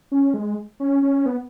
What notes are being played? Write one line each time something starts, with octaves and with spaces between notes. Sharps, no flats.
C#4
G#3
C#4
C#4
B3